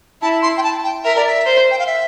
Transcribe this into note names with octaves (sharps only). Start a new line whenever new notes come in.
E4 A5
C6
G5
A5
G5
A#4 E5
D5
E5
C5
G5
F5
E5